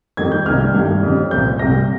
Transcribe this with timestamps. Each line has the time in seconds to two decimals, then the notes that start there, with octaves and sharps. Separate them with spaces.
0.17 F2 D#3 G3 G#6
0.32 G6
0.46 C2 C3 D#3 G3 F6
0.74 G2 D#3 G3
1.03 F2 C#3 G3
1.31 C2 A#2 F3 G6
1.59 C2 C3 G3 A#6